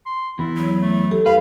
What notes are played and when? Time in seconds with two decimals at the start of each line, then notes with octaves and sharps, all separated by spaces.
0.06 C6
0.39 E2 E4
0.57 F#3
0.82 A3
1.11 G4 A4
1.26 E2 B4 F5